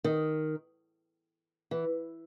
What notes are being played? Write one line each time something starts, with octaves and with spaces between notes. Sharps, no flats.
D#3
E3